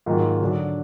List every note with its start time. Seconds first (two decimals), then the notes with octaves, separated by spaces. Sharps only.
0.06 G#2 D#3 F#3 A#3 F4
0.41 D3 F#3 D4